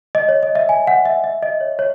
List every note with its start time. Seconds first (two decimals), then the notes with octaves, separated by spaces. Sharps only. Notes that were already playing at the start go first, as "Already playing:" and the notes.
0.15 D#5
0.29 C#5
0.43 D#5
0.55 E5
0.69 G#5
0.87 F#5
1.05 E5
1.24 E5
1.43 D#5
1.61 C#5
1.79 C#5